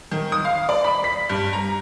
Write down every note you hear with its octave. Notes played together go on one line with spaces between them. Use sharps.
D#3
D#6
F5
D5
B5
B6
G2
A#5